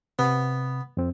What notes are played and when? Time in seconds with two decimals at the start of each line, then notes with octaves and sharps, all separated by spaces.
0.19 C3 B3
0.97 F2 C4